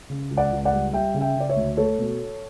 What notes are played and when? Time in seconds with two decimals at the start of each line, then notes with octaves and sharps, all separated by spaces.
0.10 C#3
0.30 C#2
0.37 D5 F#5
0.52 C#2
0.65 D5 F#5
0.73 G3
0.93 G3 E5 G5
1.14 C#3
1.21 E5 G5
1.35 C#3
1.40 D5
1.49 C#5 E5
1.56 D2
1.77 A3 A4 C#5
1.98 B2